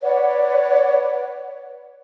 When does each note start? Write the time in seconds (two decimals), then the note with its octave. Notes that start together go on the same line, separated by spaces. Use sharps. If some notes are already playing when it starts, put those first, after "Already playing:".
0.02 B4 C#5 D5 F#5